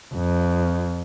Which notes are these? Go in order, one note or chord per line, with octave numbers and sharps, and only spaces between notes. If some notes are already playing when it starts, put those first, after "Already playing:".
F2